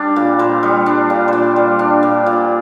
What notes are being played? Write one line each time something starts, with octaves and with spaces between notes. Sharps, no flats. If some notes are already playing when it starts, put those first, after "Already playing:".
Already playing: G3 D4 D5
A#2
A#2 C5
G3
D4
A#2
A#2 C5 D5
G3
D4 A#4
A#2
A#2